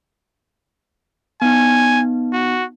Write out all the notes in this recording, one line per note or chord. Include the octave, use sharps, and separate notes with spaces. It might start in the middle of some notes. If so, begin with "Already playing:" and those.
B3 D#4 G#5
F#4